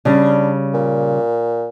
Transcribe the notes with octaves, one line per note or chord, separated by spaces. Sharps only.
C#3 G3 D4
A#2